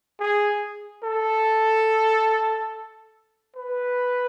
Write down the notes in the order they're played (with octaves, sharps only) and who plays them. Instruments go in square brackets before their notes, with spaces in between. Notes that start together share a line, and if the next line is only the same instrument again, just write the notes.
[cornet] G#4
A4
B4